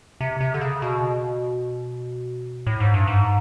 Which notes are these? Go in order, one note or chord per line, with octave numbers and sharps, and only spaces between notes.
C3
C3
D3
C#3
B2
A2
G#2
G2
G#2